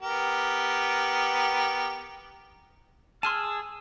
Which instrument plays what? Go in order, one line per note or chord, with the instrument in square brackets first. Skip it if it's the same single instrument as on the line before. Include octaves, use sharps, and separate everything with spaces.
[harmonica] B3 G4 A#4
[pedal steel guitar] G#4 A5 [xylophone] C6 F6 D#7 [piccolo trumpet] E6